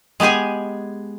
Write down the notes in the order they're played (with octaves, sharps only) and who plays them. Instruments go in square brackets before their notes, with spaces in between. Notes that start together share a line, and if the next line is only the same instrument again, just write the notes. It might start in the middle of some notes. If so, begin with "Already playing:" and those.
[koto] G#3 B3 G4 G#4 G#5